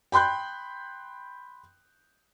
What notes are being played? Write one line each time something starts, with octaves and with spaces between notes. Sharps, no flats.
G5 B5 C6 F#6 G6